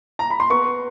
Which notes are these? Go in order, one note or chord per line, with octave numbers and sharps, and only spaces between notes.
A#5
B5
C6
B3 C#6